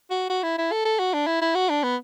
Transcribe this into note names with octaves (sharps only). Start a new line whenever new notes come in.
F#4
F#4
E4
E4
A4
A4
F#4
D4
E4
E4
F#4
D4
B3